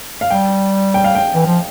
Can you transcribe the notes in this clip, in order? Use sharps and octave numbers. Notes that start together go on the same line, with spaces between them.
F5
G3 G5
G5
F5
G5
E3
F3